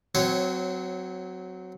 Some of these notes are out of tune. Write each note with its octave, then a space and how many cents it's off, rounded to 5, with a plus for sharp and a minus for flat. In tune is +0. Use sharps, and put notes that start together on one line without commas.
F#3 +0 C4 -25 C#5 -10